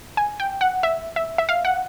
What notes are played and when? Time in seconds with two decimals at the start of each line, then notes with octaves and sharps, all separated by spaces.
0.17 G#5
0.40 G5
0.61 F#5
0.83 E5
1.16 E5
1.38 E5
1.49 F5
1.65 F#5